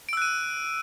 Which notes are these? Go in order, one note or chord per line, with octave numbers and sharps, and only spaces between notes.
E6 F#6 D7 D#7